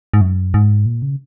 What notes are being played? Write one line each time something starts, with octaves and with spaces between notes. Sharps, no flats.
G#2
F#2
G#2
A#2
C#3